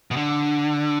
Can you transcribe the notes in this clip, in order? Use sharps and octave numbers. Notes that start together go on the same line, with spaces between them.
B2
D3